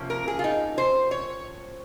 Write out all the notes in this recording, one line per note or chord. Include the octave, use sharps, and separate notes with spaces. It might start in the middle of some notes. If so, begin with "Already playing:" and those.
Already playing: C3 F3 A#3 C#4
A#4
G#4
F4
D#4
C5
C#5